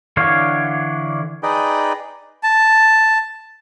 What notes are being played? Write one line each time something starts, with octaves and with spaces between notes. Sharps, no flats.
D3 E3 D4 C#5 F5
D#4 G#4 B4 D5 D#5 G5
A5